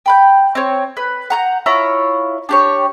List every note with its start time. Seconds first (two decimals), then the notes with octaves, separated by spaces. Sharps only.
0.06 G5 B5 G6
0.55 C4 C#5
0.97 B4
1.30 F#5 A#5 G6
1.66 E4 F4 C#5 A#5
2.49 D4 G4 C#5